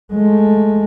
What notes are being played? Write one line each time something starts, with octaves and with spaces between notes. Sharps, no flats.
G#3 A3